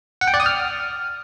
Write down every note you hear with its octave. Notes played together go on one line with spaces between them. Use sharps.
F#5
G5
D5
D#6
F6